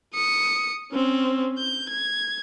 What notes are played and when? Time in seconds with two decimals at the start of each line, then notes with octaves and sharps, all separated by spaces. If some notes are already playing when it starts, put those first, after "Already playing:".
0.14 D#6 C#7
0.92 C4 C#4
1.59 G6
1.89 G#6